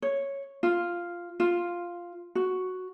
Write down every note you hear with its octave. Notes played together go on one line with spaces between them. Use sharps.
C#5
F4
F4
F#4